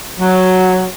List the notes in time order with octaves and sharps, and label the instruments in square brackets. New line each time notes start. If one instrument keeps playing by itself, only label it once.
[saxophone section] F#3